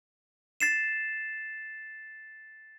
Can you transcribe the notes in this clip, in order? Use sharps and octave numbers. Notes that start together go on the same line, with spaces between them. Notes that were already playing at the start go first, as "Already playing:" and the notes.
A6 C7 E7